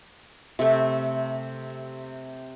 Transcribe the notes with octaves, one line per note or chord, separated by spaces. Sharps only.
C3 A3